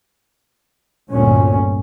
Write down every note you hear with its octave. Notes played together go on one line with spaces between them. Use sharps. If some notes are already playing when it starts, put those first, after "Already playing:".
G1 D2 A#2 C#4